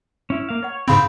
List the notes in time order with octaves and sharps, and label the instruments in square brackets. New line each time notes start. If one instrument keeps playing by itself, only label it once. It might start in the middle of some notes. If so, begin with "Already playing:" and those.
[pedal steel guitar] C#4 E4
A#3 F5
[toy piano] B4 F#5 [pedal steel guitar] C#5
[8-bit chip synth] G#2 C#3 C4 [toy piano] F5 B5 C6 [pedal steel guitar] G5